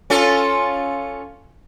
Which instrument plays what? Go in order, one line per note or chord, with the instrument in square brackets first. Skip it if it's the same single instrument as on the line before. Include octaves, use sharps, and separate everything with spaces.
[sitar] C#4 F4 A4